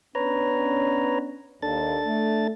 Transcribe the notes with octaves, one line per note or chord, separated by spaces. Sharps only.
B3 C#4 D4 B4 C#5 A#5
D#2 D4 A4 A6
A3